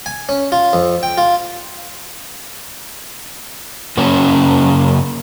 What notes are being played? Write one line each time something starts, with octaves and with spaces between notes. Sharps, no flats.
G#5
C#4
F4
F2
G5
F4
F#2 C#3 A#3 C#4